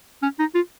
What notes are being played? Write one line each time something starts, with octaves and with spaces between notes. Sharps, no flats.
C#4
D#4
F4